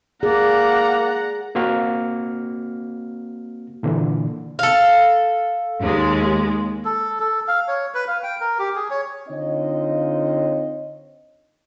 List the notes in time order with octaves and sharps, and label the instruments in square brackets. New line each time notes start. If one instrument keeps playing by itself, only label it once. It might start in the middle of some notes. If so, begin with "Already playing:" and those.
[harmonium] A#3 D5 [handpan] G#4 [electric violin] F#5 A#5
[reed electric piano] A#3 C4 F#4 F6
A#2 D3 E3
[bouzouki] A4 F5
[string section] D#2 G#3
[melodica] A4
A4
F5
C#5
B4
F5
G5
A#4
G4
G#4
C#5
[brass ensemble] D3 C4 D#4 F4 C#5 D#5